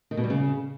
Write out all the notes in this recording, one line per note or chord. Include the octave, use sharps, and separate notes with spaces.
D#3
B2
G3
C#3